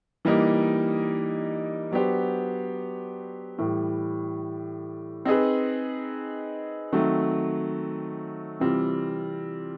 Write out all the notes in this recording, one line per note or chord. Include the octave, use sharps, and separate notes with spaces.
E3 G3 A#3 D#4
F#3 B3 D4 G4 C5
A2 E3 G3
C4 D#4 G#4 B4
D#3 F#3 A3 C4
C3 E3 G3 C4 F4